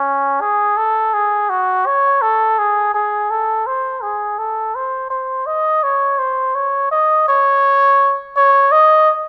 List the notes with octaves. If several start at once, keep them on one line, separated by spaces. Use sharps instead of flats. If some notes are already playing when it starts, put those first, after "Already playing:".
Already playing: C#4
G#4
A4
G#4
F#4
C#5
A4
G#4
G#4
A4
C5
G#4
A4
C5
C5
D#5
C#5
C5
C#5
D#5
C#5
C#5
D#5